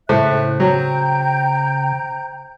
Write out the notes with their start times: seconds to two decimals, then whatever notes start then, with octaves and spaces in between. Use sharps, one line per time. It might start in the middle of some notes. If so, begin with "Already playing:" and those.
0.09 A2 C#3 C5 E5 F#6
0.60 F#3 G5 A#5 G6